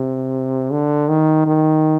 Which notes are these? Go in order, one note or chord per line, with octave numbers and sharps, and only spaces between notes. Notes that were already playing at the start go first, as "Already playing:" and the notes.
Already playing: C3
D3
D#3
D#3